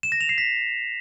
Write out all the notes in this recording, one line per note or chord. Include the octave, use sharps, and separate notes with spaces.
E7
A#6
F7
C7
B6